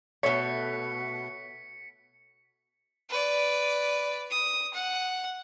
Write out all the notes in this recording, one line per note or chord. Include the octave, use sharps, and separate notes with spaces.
B2 A3 C#5 E5 B6 C#7
B4 D5
D#6
F#5